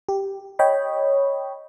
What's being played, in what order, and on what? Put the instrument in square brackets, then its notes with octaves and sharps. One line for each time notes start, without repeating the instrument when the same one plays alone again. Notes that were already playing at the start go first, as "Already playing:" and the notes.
[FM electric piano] G4
C#5 D#5 G5 B5